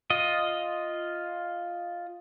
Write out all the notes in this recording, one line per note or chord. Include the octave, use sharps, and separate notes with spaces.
F4 D#5